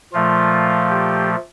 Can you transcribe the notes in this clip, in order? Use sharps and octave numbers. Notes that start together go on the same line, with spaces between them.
A#2 F3 A3 F4
G4